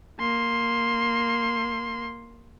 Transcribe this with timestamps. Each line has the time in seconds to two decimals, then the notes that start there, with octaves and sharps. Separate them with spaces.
0.20 A#3 C6